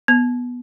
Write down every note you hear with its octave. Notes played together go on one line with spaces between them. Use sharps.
B3